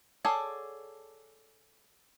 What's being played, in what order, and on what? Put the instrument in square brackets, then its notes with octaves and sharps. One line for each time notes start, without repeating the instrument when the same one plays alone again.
[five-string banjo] G#4 A4 C#5 D5 F#5